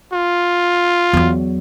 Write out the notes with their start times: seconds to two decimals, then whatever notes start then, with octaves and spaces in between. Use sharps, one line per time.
0.13 F4
1.13 E2 F#3